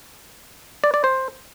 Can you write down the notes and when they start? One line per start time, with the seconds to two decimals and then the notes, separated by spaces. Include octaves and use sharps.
0.84 D5
0.94 D5
1.04 C5